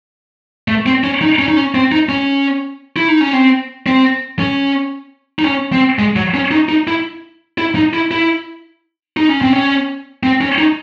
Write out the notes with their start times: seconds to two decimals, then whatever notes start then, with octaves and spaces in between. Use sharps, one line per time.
0.68 A3
0.86 C4
1.04 C#4
1.22 D#4
1.39 C#4
1.48 D#4
1.57 C#4
1.75 C4
1.92 D#4
2.09 C#4
2.97 E4
3.08 D#4
3.21 C#4
3.33 C4
3.86 C4
4.39 C#4
5.39 D#4
5.45 C#4
5.72 C4
5.99 G#3
6.16 F#3
6.34 C#4
6.51 D#4
6.69 D#4
6.88 E4
7.58 E4
7.75 D#4
7.93 E4
8.11 E4
9.17 D#4
9.29 C#4
9.41 C4
9.53 C#4
10.23 C4
10.41 C#4
10.58 D#4